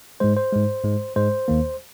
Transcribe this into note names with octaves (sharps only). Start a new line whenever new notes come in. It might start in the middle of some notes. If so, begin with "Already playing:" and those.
G#2 G#3 C5
C5
G#2 G#3
G#2 G#3
G#2 G#3 C5
D#2 D#3 A#3